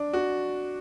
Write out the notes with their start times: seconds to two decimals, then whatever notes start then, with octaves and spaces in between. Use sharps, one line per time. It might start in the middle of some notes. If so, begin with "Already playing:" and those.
Already playing: D4
0.13 F#4